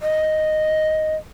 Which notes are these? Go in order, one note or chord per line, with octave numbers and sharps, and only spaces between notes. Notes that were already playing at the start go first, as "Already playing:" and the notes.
D#5